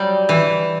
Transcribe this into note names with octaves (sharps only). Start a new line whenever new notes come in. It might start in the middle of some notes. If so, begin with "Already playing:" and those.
Already playing: F#3 G3
E3